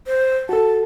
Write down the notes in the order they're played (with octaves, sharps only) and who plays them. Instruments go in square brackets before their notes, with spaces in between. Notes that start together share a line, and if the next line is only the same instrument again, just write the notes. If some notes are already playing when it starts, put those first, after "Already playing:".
[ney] C5
[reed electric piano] F#4 A4 [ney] A5